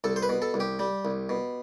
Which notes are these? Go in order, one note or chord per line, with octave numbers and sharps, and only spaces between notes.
C2 A4
C5
B4
B2
A4
C2
G4
G3
C2
B2